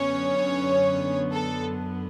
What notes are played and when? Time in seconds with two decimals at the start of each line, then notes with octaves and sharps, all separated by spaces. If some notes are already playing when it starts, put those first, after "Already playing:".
Already playing: F#2 D3 F#3 B3 C#4 C#5
1.31 A4